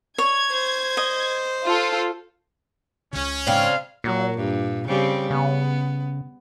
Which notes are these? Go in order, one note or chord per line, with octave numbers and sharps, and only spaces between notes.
C#5 G#6
C5
D#5
F4 A4
C#2 C#3 C#4
G#2 C#3 C4 D4 F5
A#2 F#3
G2
C#3 G3 C4
C#3 B3